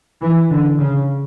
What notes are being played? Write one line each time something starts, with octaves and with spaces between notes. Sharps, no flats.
E3
D3
C#3